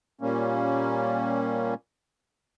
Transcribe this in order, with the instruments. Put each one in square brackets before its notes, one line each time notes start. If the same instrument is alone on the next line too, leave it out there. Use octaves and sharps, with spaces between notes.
[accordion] A#2 G3 A#3 C#4